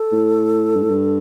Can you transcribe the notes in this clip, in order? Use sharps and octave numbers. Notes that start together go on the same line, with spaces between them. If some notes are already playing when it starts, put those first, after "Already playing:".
Already playing: A4
A2
G2
A2
G2